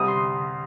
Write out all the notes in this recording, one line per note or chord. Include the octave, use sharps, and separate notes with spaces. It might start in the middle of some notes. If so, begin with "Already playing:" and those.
Already playing: C2 C3 G3 D#6
C6